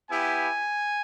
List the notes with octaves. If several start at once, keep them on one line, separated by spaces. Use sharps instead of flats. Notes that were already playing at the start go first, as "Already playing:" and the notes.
B3 E4 G4 G#5